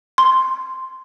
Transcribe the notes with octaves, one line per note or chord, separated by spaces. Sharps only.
C6